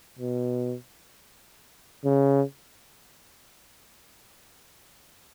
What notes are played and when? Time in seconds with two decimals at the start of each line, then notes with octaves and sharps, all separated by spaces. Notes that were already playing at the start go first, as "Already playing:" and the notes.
0.19 B2
2.05 C#3